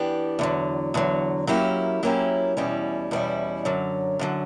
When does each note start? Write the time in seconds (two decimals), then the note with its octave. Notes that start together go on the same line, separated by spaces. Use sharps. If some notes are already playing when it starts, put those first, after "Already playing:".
Already playing: E3 B3 D4 G4
0.39 E2 D3 F#3
0.94 E2 D3 F#3
1.47 F#3 A#3 C#4 E4 G4
2.03 F#3 A#3 C#4 E4 G4
2.57 E2 B2 G3 C#4 E4
3.11 E2 B2 G3 C#4 E4
3.65 F#2 D3 F#3
4.19 F#2 D3 F#3